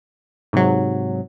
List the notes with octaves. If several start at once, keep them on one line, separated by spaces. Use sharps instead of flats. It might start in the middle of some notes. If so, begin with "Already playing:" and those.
G#2 C3 F#3